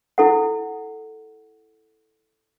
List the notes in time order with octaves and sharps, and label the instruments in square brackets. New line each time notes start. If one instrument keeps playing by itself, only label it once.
[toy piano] E4 A4 F#5